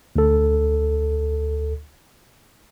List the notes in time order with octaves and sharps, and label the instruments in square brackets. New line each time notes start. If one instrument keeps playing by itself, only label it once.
[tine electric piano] D2 A4